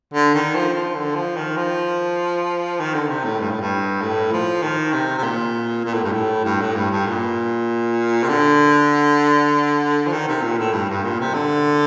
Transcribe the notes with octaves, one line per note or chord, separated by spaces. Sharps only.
D3
D#3
F3
F3
D3
F3
D#3
F3
D#3
D3
C3
A2
G2
A2
G2
A2
F3
D#3
C3
C3
A#2
A#2
A2
G2
A2
G2
A2
G2
G2
A#2
C3
D3
F3
D#3
C3
A#2
A2
G2
G2
A#2
C3
D3